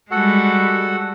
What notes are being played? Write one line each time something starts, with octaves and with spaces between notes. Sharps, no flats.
G3 G#3 F#4 A4 F#5